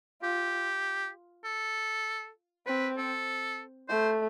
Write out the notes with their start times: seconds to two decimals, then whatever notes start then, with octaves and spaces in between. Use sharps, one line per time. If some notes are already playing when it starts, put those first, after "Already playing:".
0.22 F4 G4
1.44 A4
2.66 C4 B4
2.97 A4
3.89 A3 C5